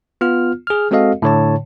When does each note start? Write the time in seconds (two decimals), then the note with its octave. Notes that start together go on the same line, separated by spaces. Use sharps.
0.21 B3 F4 F6
0.67 G#4 F6
0.91 G#3 C4 F#4 A4 D#5 F5
1.22 A2 D3 C#5 A5